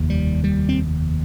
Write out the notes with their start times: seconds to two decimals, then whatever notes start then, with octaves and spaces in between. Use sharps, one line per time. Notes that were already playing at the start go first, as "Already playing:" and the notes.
Already playing: F1 D#2
0.10 G3
0.44 G3
0.69 C4